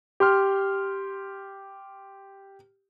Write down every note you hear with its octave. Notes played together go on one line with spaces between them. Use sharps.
G4 C6 F6